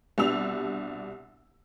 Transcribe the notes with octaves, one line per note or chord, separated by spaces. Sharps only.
C2 B2 G3 D4 E6 F7